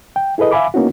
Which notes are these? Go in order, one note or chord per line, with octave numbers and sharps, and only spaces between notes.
G5
E4 G#4 A4 B4 D#5
E5 F5 G#5 B5 D6
A#3 B3 C#4 D#4 E4 F#4